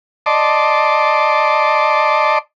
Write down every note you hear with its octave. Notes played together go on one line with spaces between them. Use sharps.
D5 D#5 A5 C6 D6